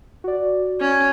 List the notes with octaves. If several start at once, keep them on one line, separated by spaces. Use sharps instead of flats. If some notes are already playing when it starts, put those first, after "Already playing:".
F#4 D5
C#4